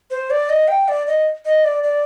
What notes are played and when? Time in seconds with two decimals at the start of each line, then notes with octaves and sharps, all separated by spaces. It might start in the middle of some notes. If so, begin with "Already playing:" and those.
0.11 C5
0.30 D5
0.49 D#5
0.68 G5
0.88 D5
1.07 D#5
1.45 D#5
1.64 D5
1.84 D5